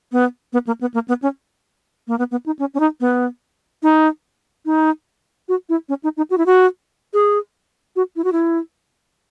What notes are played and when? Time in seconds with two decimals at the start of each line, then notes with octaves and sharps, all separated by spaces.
0.12 B3
0.53 B3
0.67 A#3
0.81 B3
0.94 A#3
1.08 B3
1.22 C#4
2.08 A#3
2.18 B3
2.31 B3
2.46 D#4
2.59 C#4
2.74 C#4
2.80 D#4
3.00 B3
3.83 D#4
4.65 D#4
5.49 F#4
5.69 E4
5.89 C#4
6.03 D#4
6.17 D#4
6.30 F#4
6.38 E4
6.46 F#4
7.13 G#4
7.96 F#4
8.16 E4
8.24 F#4
8.32 E4